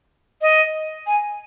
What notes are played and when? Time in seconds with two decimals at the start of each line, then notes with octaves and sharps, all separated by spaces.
0.42 D#5
1.07 G#5